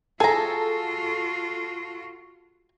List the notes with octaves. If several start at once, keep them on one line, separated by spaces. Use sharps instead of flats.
F4 F#4 G#4 A4 A#5